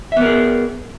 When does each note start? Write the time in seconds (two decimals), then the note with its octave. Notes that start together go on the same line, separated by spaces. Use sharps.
0.12 E5
0.17 B3
0.21 A#4
0.26 G#4